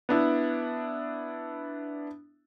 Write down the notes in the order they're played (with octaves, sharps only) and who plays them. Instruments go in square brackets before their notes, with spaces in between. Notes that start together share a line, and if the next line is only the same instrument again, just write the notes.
[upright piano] B3 D4 E4